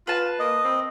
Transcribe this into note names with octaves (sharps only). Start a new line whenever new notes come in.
F4 B4 A5
A#3 D#5
C4